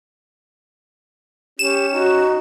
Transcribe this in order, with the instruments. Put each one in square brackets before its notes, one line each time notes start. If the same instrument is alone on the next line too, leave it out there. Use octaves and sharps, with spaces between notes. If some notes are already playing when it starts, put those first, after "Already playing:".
[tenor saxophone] C#4 [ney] G4 [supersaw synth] E7
[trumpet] D#4 [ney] F#4